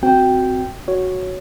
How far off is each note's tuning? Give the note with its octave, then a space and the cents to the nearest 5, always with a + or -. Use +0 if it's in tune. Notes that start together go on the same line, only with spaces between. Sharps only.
C4 -10 F#4 +0 G5 +0
F#4 +0 C#5 +0